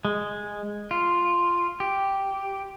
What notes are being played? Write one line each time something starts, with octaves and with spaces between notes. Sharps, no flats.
G#3
F4
G4